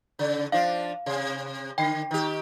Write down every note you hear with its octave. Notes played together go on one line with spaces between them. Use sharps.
C#3
F3 D4 F5
C3
D3 G5 C7
D#3 G4